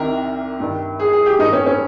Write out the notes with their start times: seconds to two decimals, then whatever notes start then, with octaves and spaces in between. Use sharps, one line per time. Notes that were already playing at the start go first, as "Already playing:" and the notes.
Already playing: C2 C3 D#3 A#4
0.60 G2 D#3
1.00 G#4
1.13 G#4
1.26 G4
1.39 G2 D#3 D#4
1.53 C#4
1.66 C#4